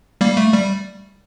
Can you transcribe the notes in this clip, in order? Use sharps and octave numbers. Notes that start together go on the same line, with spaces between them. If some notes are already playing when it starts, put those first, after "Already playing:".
G3 A#3
A3
G3